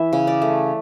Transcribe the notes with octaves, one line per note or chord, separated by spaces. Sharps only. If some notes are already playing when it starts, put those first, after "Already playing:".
Already playing: E3 E4 E5
C#3
D5
A3